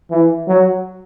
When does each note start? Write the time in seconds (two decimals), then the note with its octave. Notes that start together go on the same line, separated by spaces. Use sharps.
0.11 E3
0.48 F#3